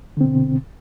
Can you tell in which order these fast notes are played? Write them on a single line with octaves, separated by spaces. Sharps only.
D3 C4 B2